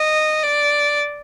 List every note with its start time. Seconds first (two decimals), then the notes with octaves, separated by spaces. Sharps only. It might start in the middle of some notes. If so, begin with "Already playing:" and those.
Already playing: D#5
0.42 D5